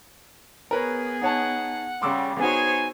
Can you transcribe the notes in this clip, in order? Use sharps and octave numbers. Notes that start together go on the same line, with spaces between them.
B3 G#4 A#4 B4 C#5
D#4 C#5 F#5 A5
C#3 G3 C6 D6 E6
B3 D#4 F#4 G#4 C5 C#5 G#5